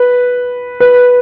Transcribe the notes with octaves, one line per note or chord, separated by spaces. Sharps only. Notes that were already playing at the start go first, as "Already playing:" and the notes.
Already playing: B4
B4